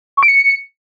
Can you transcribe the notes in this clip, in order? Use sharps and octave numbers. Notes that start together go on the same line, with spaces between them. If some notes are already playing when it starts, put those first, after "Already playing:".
C#6
D7
C#7